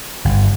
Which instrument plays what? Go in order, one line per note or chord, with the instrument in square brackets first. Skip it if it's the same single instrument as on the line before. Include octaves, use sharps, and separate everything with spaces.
[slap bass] G1